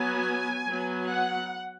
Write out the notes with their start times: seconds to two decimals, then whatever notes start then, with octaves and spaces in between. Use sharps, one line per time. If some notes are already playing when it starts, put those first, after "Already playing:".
Already playing: F#3 B3 G#5
0.66 F#3 B3
1.10 F#5